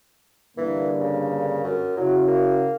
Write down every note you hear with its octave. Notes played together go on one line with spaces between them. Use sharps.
G2 D3 E3 A#3
C#3
F#2
C#3 F#3 E4 F#4
A#3